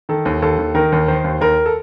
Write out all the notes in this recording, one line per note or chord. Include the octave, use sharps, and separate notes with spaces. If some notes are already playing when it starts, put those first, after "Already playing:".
D#3 A4
D#2
D#2 A4
D#2
D#3 A#4
D#2
D#3 C5
D#2
D#2 A#4
A4